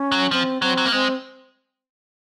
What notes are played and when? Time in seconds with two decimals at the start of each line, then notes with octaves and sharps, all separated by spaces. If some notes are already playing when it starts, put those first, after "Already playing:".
Already playing: C#4
0.12 F#3
0.31 F3 C4
0.62 F#3 C4
0.78 F#3
0.86 A#3
0.93 G#3 C4